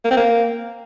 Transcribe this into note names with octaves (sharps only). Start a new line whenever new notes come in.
A#3
C4
A#3